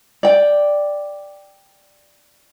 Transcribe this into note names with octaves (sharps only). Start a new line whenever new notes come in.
D5 G5